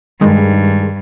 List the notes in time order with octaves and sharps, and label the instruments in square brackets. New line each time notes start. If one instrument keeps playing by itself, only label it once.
[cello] G2 [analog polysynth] D#3 G#3